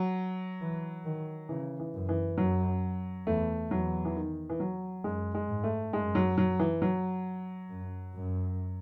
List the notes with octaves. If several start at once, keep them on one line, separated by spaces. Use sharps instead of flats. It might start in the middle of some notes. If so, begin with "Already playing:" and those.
Already playing: F#3
E3
D#3
C#3 E3
E3
F#2
E3
F#2 F#3
E2 A3
E2 F#3
E3
D#3
E3
F#3
F#2 G#3
G#3
G#2
A3
F#2 G#3
F#3
F#3
E3
F#3
F#2
F#2